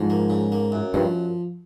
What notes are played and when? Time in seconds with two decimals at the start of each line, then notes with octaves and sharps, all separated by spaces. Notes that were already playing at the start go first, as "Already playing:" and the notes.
Already playing: G#2 F3
0.10 A#3
0.30 C#3
0.52 A#3
0.72 F#2
0.94 G2 F3